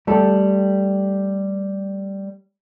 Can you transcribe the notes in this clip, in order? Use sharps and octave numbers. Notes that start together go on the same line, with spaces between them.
G3 A3 G4 A4